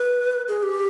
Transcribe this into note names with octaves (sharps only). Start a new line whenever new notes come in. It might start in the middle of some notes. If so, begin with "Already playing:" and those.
Already playing: B4
G#4
G4